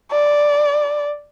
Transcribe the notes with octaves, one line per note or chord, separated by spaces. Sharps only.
D5